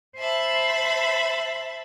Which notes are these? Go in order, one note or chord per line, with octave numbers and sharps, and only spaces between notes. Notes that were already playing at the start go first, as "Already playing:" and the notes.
C5 E5 A5 B5